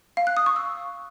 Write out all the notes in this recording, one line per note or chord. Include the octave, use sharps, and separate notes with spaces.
F5
F#6
D#6
C#6
E6